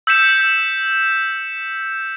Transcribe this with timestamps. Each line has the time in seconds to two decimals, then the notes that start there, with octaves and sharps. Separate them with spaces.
0.07 E6 G6 B6 C#7 E7